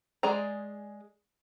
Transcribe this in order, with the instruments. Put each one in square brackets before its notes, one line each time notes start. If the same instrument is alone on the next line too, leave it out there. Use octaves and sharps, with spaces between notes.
[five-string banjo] G#3 G#4 D5 A#5